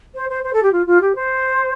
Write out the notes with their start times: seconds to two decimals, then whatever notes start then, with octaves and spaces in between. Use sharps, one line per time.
0.15 C5
0.29 C5
0.44 C5
0.53 A4
0.63 G4
0.72 F4
0.86 F4
1.01 G4
1.15 C5